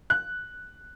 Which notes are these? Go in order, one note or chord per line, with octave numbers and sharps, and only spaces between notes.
F#6